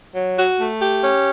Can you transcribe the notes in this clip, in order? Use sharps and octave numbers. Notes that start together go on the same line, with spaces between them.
F#3
F#4
A3
G4
C#4